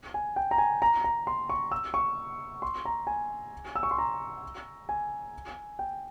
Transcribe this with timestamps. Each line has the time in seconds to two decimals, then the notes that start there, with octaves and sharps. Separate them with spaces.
0.14 G#5
0.36 G5
0.51 A#5
0.58 G#5
0.82 A#5
1.04 A#5
1.27 C6
1.50 C#6
1.72 E6
1.94 C#6
2.62 C6
2.85 A#5
3.07 G#5
3.75 E6
3.83 C#6
3.91 C6
3.98 A#5
4.89 G#5
5.79 G5